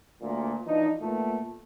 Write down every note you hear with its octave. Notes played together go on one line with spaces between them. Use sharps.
D2 A#2
E3 F3 D4 D#4
A#2 A3 B3 F4